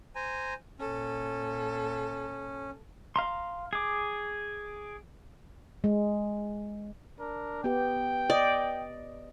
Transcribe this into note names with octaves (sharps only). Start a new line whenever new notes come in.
C5 G#5 A#5
A#2 C#4 A4
F5 A#5 C6
G#4 D6
G#3
D4 A#4
B3 G4 G5
D5 D#5